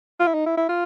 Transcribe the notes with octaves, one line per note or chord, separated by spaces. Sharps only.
F4
E4
D#4
E4
E4
F4